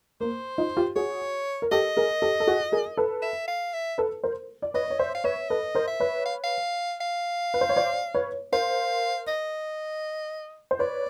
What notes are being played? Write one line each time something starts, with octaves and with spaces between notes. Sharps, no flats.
A#3 C5
D#4 F4
F4 G4
F#4 G#4 C#5
A#4
G4 A4 D#5
G#4 A#4
G4 A4
A4
F#4 G#4
G#4 A#4
A4 B4
E5
F5
E5
A4 B4
A#4 C5
D5
B4 C#5 D#5
C#5
C5 D5 E5
F5
B4 C#5 E5
A4 B4 D#5
A#4 C5
E5
B4 C#5
F5
F5
F5
B4
C5
C#5
C5 D5
B4 C#5
A#4 C5 F5
D#5
C5
B4 C#5 D5